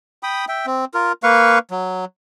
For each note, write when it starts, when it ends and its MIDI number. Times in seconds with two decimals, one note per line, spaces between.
0.23 0.45 79
0.23 0.45 83
0.23 0.45 87
0.48 0.66 76
0.48 0.66 79
0.66 0.85 60
0.94 1.12 65
0.94 1.12 70
1.23 1.59 58
1.23 1.59 71
1.23 1.59 77
1.23 1.59 85
1.71 2.05 54